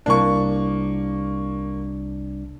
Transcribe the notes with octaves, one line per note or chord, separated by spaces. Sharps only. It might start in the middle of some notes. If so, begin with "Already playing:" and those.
C2 A#3 D4 C#6